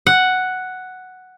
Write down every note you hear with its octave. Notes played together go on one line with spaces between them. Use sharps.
F#5